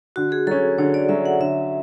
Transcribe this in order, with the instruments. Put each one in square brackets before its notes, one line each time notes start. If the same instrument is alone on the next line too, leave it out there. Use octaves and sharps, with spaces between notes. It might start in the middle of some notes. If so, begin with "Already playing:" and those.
[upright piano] D3 [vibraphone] F#4
[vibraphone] G#4
[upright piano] F#3 C#4 [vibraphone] A4
[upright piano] D3 [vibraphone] C#5
[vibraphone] D5
[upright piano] F#3 C#4 [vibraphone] E5
[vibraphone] F#5
[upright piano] D3 [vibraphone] E5